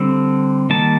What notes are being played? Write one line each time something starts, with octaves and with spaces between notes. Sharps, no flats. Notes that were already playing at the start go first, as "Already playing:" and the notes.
Already playing: D3 G3 C4
D#3 G3 A#3 A5